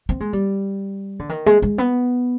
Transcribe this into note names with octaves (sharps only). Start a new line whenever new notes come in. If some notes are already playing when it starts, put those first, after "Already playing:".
C4
G#3
G3
D3
D#3
G#3
G#3
B3